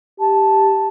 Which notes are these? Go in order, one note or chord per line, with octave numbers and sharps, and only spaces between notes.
G4 A5